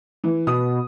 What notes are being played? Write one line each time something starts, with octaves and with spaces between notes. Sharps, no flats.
E3
B2 D#6